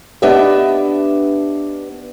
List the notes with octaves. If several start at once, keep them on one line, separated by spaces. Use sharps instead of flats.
B3 D4 G4 D#5 E5